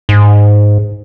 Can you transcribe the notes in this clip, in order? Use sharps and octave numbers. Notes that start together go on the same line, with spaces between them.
G#2